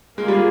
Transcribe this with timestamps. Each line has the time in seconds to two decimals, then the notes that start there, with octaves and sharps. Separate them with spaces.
0.18 G#3 A#3 F4 G#4
0.28 G3